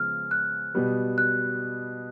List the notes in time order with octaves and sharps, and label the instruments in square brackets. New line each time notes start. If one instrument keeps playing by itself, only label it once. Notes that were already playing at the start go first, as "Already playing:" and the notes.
Already playing: [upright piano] C#3 F3 G#3 B3 [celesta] F6
[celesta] F#6
[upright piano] B2 G3 B3
[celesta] F#6